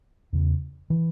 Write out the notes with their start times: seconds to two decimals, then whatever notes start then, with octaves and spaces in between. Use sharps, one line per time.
0.33 E2 C#3
0.90 E3